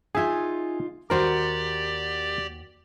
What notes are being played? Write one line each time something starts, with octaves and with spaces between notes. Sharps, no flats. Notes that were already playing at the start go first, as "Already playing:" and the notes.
D#4 F4 G#4 E5 G#5
D#2 F#4 G4 A#4 C5 D5 F#5